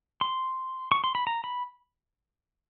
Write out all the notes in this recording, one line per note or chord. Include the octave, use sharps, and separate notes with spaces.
C6
C#6
C6
B5
A#5
B5